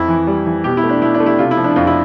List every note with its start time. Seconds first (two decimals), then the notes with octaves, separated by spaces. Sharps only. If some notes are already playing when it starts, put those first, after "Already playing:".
Already playing: F2 E4
0.08 E3
0.27 G3
0.46 E3
0.64 B2 G4
0.77 E4
0.84 A3
0.89 D4
1.02 B2 E4
1.14 D4
1.20 A3
1.26 E4
1.39 C3 F4
1.51 E4
1.57 F3
1.64 D4
1.76 F2 F4
1.87 E4